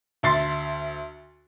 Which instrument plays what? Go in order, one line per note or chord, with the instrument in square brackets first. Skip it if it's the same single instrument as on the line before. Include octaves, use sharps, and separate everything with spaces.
[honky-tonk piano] D2 E5 C6 A6 C7